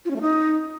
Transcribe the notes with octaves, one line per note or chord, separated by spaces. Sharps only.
F4
C#4
A3
D#4